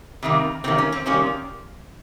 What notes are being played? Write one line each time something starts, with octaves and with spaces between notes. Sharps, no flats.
C3 D#3 G3 A#3
C3 D#3 G3 A#3 C4
C#4
C4
C3 D#3 G3 A#3 C#4